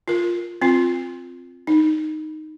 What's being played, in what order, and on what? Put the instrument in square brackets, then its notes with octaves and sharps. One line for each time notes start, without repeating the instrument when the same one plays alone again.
[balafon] F4 A#4
C4 F4
D#4